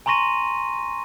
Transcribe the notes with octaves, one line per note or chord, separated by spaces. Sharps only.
G#5 A#5 C6 C#6 A#6 D#7